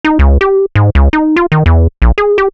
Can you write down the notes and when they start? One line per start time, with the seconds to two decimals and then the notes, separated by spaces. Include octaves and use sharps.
0.05 D#4
0.19 C#2
0.41 G4
0.75 G#2
0.95 C#2
1.13 D#4
1.36 F4
1.52 D#3
1.66 E2
2.02 A#1
2.18 G#4
2.38 G4